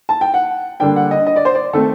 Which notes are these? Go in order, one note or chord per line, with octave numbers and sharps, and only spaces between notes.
A5
G5
F#5
D3 G3 A#3 D4 G5
F#5
D#5
D#5
D5
C5
D5
D#3 A3 C4 A4